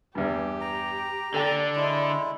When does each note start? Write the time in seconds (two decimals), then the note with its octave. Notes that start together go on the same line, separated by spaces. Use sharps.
0.15 E2 G2 G4
0.61 A#5
1.34 D3 D4 A4 G5
1.76 G#3 E4